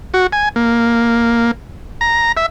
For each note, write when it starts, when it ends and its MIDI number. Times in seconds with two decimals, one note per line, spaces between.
0.14 0.27 66
0.32 0.49 80
0.56 1.51 58
2.01 2.32 82
2.37 2.46 76